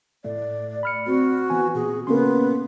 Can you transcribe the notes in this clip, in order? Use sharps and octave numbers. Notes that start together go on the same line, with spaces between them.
A2 A3 D5
B5 F6 C#7
C4 F#4
E3 B3 G#5
A#2 G#4
C#3 A#3 B3 C6